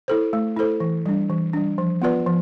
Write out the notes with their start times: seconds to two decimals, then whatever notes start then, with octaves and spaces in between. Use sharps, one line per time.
0.08 E4 A4 C5
0.33 A3
0.57 E4 A4 C5
0.80 E3
1.06 G3 D4
1.30 E3
1.53 G3 D4
1.78 F3
2.02 B3 F4 B4 D5
2.26 F3